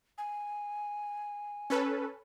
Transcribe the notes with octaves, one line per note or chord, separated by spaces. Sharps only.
G#5
C#4 A4 B4